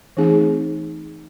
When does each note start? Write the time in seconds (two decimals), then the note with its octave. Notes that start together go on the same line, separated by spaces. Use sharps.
0.17 E3 A3 C4 D#4 G#4